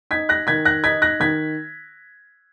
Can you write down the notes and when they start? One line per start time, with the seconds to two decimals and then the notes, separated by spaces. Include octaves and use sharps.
0.11 D#4 G#6 B6
0.29 F#6 A#6
0.47 D#3 G#6 B6
0.65 F#6 A#6
0.84 D#4 G#6 B6
1.02 F#6 A#6
1.20 D#3 G#6 B6